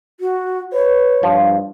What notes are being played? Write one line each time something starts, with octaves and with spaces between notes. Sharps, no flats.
F#4
B4 C#5
G2 F3